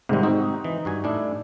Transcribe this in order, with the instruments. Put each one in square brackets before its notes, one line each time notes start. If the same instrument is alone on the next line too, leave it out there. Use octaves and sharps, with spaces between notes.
[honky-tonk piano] G#2 G3 [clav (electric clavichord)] C3 D#3
[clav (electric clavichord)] C4 F#4 [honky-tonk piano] D#4
[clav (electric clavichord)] E3
G2 F#4 G#5
A2 D4 E4